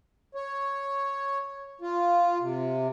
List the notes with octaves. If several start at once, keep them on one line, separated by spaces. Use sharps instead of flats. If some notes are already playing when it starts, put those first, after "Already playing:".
C#5
F4
C3